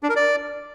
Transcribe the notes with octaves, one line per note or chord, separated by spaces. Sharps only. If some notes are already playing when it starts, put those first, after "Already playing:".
D4
A#4
D5